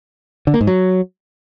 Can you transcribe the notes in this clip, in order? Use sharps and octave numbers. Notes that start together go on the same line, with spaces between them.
D3
A#3
G#2
F#3